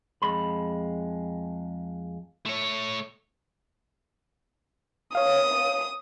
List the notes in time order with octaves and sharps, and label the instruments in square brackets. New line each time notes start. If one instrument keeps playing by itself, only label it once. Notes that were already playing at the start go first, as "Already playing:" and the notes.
[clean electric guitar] F2 G#3 B5
[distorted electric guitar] A3 C#5
[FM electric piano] C#5 F5 [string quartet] D#6